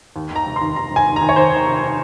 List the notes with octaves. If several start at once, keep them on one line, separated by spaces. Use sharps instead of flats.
D#2
D#3
A#5
F1
C6
D#2
D#2 A#5
F1
G#5
D#2
A#5
D#3
C#5
D#2 C5
D#3
F1